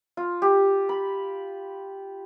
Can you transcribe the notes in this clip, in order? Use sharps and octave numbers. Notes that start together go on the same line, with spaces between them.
F4
G4
B5